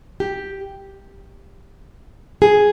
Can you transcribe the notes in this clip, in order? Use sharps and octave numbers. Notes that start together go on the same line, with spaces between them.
G4
G#4